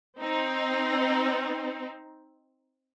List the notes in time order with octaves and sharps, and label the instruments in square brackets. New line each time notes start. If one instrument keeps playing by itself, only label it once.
[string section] C4 D#4